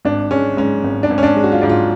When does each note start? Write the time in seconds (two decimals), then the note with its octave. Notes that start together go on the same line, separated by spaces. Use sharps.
0.05 G#1 D4
0.31 G#3 C#4
0.57 G#2 C#4
0.84 G#1
1.03 D4
1.10 G#1
1.18 C#4
1.23 D4
1.36 G#3
1.44 F#4
1.52 F4
1.61 G#2 D4
1.69 F4